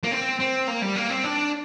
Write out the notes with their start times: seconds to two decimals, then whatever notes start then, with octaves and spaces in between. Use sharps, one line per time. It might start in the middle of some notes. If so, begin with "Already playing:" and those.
0.03 A#3
0.11 C4
0.39 C4
0.67 A#3
0.82 G3
0.96 A#3
1.10 C4
1.24 D4